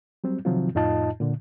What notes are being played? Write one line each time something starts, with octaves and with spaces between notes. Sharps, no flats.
F#3 G3 C4
C3 D#3 F3 F#3 C4 F4
F2 A2 D#4 F4 D#5 A5
A#2 D3